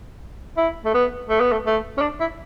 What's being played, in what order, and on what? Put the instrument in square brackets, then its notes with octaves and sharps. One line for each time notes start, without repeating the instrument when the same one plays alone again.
[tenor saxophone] E4
A3
B3
A3
B3
A3
A3
C#4
D4
E4